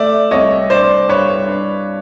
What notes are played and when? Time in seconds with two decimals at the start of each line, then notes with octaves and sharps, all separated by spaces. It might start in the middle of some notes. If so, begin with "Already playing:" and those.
Already playing: A3 D5 E5
0.31 C2 C#5 D#5
0.70 D4 C5 D5
1.09 G2 B4 C#5
1.47 D4